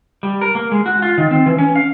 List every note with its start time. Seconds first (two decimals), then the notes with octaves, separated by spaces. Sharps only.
0.23 G3
0.41 A#4
0.55 A#3
0.72 G#3
0.86 F#4
1.02 F4
1.18 D#3
1.31 C4
1.46 E3
1.58 C#4
1.76 F5